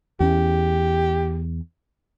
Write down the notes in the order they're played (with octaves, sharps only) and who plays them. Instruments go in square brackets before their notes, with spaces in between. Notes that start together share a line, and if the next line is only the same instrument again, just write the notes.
[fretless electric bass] E2 C#4 [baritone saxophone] G4